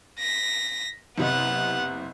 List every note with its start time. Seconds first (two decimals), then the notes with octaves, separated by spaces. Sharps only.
0.19 A#6 B6
1.18 F#1 C3 B3 D#5 F#5